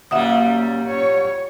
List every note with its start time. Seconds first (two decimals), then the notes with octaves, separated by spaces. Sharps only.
0.11 A#2 F#3 G3 A#3 C#4 E5 F#5 D#6
0.86 C#5